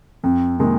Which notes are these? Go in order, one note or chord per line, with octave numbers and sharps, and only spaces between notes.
F2 C4
C3 D#3 G#3 A#3